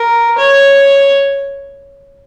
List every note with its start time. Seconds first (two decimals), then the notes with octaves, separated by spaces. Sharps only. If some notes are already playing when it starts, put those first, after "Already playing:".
Already playing: A#4
0.38 C#5